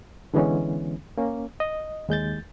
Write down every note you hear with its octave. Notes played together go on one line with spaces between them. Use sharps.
D3 E3 G#3 B3 C#4
A#3 C#4
D#5
D#2 G#3 G6 A6